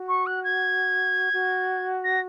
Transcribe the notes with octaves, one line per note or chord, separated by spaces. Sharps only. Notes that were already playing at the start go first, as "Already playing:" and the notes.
Already playing: F#4
C#6
F#6
G#6
F#4
A#6